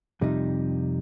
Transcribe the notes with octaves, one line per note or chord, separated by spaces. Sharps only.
F2 C3 G3 D#4